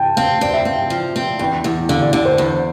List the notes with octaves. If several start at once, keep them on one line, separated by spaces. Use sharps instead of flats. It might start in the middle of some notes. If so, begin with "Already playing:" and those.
Already playing: G5 A5
C4 F5
C4 D5
E5
C4 F5
G5
F3
C4
E2 G5
E2
D3 F5
D5
D3 D5
C5
E2